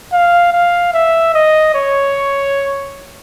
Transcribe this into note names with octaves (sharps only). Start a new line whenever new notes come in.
F5
F5
E5
D#5
C#5